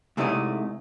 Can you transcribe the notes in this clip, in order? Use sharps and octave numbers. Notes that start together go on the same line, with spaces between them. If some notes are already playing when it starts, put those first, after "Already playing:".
G#2 C3 A3 E4 D5 D#5